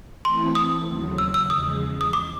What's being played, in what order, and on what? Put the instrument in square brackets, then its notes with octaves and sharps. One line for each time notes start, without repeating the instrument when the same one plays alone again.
[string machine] E3 A3 C4 E4 A4 [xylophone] C6
[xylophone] D#6
[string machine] D#2 C#3 F#3
[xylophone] E6
E6
[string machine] E2 C#3 F3 G#3 [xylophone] D#6
[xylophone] D#6
D6